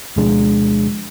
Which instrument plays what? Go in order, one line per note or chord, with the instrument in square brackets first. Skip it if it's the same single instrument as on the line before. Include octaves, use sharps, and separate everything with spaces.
[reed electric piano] D2 B2 F3 G#3 D4